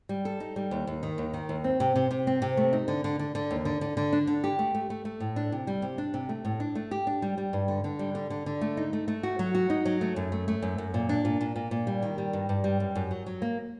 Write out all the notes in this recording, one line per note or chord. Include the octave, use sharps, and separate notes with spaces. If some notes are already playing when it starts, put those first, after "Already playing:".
G3
A4
D#4
G3
D#2
D#2
D#3
D#2
D#3
D#2
C4
C3
C3
C3
C4
C3
A3
D#4
D3
D3
D3
D3
D#2
D3
D3
D3
D4
D3
G4
A3
A3
A3
A3
A2
D4
C3
G3
C3
D4
C3
A3
A2
D4
A3
G4
D4
G3
G3
G2
D3
D3
G3
D3
D3
D3
A3
D#4
A3
A3
F#4
F#3
F#4
D#4
F#3
A3
F#2
A3
A3
F#2
F#2
A#2
D4
A#2
A#2
A#2
A#2
G3
D#3
G3
G2
G2
G3
F#2
F#2
F#3
F#3
A#3